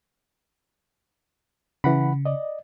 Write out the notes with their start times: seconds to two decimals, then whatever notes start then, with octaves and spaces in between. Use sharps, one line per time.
1.84 C#3 E3 F#5 B5
2.25 D5 D#5